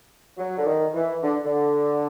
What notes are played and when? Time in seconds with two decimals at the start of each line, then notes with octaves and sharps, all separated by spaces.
0.38 F#3
0.58 D3
0.66 D#3
0.94 E3
1.23 D3
1.45 D3